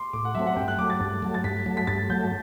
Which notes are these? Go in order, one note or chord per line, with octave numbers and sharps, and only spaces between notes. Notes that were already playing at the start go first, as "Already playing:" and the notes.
Already playing: C6 D6
A2 D6
F#5
F#3 A3 C4 E5
F#5
G2 G5
F#6
F#3 A3 D6
A6
G2
F#3 A3
A6
G2 B6
F#3 A3
B6
G2 A6
F#3 A3 G6